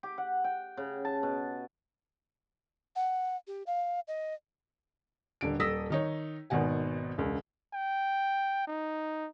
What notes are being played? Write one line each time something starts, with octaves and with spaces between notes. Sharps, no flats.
G4
F#5
G5
C#3
A5
B2
F#5
G4
F5
D#5
D#1 D3 D7
D#1 A4 D#6 E6 A#6 B6
D#3 D#4 C#5
G#1 B2 D#3 F#5 G#5
E1 C#2
G5
D#4